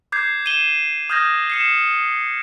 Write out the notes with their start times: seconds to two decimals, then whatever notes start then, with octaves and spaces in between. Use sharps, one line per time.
0.12 D6 G6 G#6 C7
0.46 D#7 E7 G7
1.10 D#6 F6 G6 G#6 A#6
1.50 C7 C#7 E7